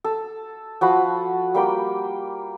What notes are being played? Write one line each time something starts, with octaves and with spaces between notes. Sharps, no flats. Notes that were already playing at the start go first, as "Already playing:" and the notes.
A4
F3 F#4 B5
G3 A#3 G5 B5